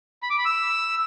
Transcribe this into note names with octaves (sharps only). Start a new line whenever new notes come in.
B5
D6
B5
E6